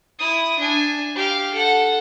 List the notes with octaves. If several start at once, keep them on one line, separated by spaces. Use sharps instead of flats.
E4 D#6
D4 G#5
G4 F5
A4 F#5